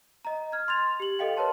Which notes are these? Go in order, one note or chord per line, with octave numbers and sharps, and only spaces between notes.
D#5 A#5
F6 G#6
C6 A6 F7
G4 F#7
A4 D#5 F5 G5
A#4 B4 C#5 A5 C6